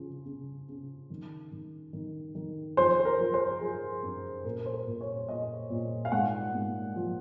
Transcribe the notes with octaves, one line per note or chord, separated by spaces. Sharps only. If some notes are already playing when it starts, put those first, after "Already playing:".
Already playing: C#3 F3
C#3
C#3
D#3
D#3
D#3
D#3
F3 C5
C5
A#4
F3
C5
F3 G#4
F#2
A#2 A#4
C5
A#4
A#2
C#5
A#2 D#5
A#2
F5
G#2 F#5
G#2
F3